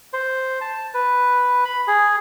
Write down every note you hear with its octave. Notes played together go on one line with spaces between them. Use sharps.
C5
A5
B4
B5
G#4